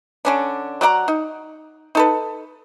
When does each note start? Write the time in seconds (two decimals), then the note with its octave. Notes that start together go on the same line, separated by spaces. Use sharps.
0.25 D3 C#4 D4
0.81 F#3 D5 F#5 A#5
1.08 D#4
1.95 D#4 A4 B4